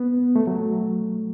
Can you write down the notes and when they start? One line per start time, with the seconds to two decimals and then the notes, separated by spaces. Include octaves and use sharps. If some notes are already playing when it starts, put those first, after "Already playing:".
Already playing: B3
0.36 A3
0.47 F#3